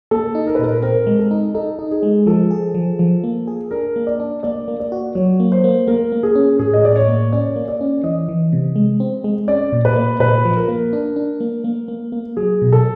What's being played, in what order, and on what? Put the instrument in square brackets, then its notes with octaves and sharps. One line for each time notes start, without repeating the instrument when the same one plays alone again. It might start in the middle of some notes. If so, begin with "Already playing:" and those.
[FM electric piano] A#3 [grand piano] A4
[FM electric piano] D#4
[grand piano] A#4
B4
[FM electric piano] A#2 [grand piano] A#4
[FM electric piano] C4 [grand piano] A#4
[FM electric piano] G#3
[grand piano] A4
[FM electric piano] D#4
[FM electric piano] D#4 [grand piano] A4
[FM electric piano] D#4
[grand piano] G#4
[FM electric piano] G#3
[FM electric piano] F3 [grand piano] A4
[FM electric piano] G#4
F3
F3
A#3
G#4
[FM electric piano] D4 [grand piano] A#4
[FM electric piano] A#3
[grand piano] D5
[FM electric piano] D4
[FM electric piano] A#3 [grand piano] D5
[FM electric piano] A#3
[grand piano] D5
[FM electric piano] F#4
[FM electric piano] F#3 [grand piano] C#5
[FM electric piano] A#3
[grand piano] C5
[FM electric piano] A#3
[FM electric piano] A#3 [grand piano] A#4
[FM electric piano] A#3
[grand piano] G#4
[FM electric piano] C#4
[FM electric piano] A2 [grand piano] G#4
[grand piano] D#5
[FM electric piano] A2 [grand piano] D5
[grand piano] C#5
[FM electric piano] A#3
[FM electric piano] C#4 [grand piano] D5
[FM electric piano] A#3
[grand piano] D5
[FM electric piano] C#4
[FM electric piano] E3 [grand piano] D#5
[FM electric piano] E3
C3
G#3
C4
G#3
[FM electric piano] C#4 [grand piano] D5
[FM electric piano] A#2
[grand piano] B4
[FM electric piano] A#3
[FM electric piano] A#2 [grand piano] B4
[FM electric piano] F3
[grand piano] A#4
[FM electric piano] A#3
D4
D4
A#3
A#3
A#3
A#3
[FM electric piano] F#3 [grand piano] G#4
[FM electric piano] B2
[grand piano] A4